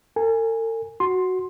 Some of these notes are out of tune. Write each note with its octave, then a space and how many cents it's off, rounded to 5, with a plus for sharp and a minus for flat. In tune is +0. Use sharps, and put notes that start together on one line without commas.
A4 +45 G#5 -10
F#4 +0 C6 +10